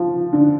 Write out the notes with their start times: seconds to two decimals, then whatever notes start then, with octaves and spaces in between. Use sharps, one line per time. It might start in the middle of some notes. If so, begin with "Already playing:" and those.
Already playing: F3
0.33 D3